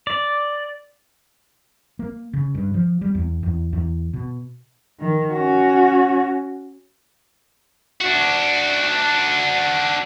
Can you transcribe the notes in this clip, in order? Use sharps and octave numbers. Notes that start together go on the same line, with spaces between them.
D5
A#3
C#3
G2
F3
G3
E2
E2
E2
B2
D#3
C#4 F#4
D4 F#4